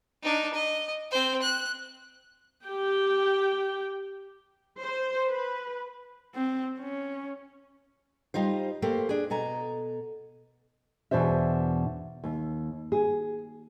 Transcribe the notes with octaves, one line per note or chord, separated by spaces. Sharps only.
D4 D#4
D#5
C4 C5
F#6
G4 G5
C5
B4
C4
C#4
G3 D#4 F4 C5
A3 A#3 G4 C5
D4 G#4
B2 A4 G#5 A#5
E2 B2 D4 C5 E5
D#2
G#4